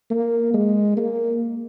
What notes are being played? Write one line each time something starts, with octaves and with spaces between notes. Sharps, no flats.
A#3
G#3
A#3